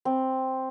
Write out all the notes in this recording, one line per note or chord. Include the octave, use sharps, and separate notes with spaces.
C4